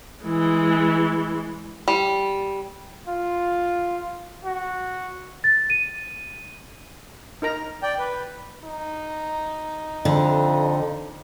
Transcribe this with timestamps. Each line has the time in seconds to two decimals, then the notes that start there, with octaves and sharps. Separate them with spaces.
0.24 E3 G#3
1.88 G3
3.08 F4
4.44 F#4
5.44 A6
5.70 D#7
7.42 D#4 A#4 A#5
7.83 D5 G5
7.99 B4
8.64 D#4
10.05 F2 D3